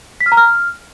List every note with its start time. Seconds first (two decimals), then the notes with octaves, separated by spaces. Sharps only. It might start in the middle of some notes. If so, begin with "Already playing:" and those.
0.20 B6
0.26 F6
0.32 A#5
0.37 F6